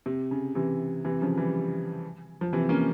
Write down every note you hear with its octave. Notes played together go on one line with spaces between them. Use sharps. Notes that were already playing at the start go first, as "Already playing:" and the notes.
C3
C#3
C3 E3
C3 E3
C#3 F3
E3 G3
F3
C3 E3
A#3 C#4